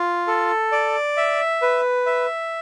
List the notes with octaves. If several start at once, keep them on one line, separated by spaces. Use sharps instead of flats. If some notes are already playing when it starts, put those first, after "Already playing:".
Already playing: F4
A4
D5
E5
B4
E5